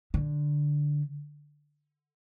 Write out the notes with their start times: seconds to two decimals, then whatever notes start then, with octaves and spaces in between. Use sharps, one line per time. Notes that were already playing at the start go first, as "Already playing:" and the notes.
0.14 D3